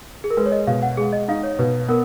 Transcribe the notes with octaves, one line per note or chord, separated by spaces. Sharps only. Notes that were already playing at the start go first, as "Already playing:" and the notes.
G#4
A#4
G#3 B4
C#5
D#5
B2 F5
F#5
G#3 G#4
D#5
D#4 F5
C#5
B2 B4
B3 A#4